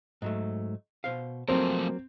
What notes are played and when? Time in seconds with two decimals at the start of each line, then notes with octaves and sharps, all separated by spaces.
0.22 G#2 F#3 A3
1.04 B2 C5 F5
1.49 F3 F#3 A3 A#3 C4 A4 A#4